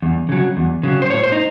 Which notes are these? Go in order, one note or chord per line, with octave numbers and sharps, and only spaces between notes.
E2
C#3 F#3
E2
C#3 F#3
C5
A2 C#5
C5
D#4